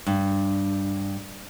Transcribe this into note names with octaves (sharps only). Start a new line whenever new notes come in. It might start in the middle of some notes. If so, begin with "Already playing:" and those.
G2